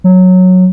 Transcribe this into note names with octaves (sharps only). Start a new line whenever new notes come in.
F#3